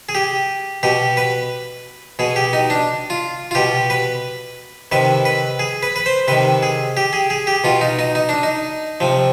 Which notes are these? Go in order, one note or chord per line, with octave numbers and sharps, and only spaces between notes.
G#4
G4
B2 G4
B4
B2 G#4
G4
D#4
D4
F4
F4
B2 G4
B4
C3 D#3 B4
B4
G#4
B4
B4
C5
C3 D#3 B4
G#4
G4
G#4
G#4
G4
B2 F4
D#4
D#4
D#4
D4
D#4
C3 F3